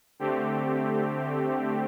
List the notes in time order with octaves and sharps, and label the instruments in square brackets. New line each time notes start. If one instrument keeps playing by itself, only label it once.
[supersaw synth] D3 A3 C4 G4